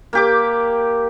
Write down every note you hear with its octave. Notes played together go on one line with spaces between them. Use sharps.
A#3 G4 D6